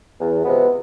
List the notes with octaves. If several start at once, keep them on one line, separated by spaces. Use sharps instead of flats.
E2
C3 F3 G#3 B3